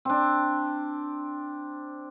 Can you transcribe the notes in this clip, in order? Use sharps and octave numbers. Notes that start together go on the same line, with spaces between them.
C4 D4